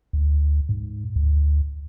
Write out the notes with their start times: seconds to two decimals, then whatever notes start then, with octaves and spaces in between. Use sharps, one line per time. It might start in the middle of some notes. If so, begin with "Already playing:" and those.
0.13 D2
0.69 G#2
1.16 D2